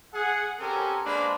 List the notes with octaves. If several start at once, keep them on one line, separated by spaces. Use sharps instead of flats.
G#4 F#5
C4 C#4 G4 A4 A#4 G#5
G#3 A#3 D4 B4 C5 B5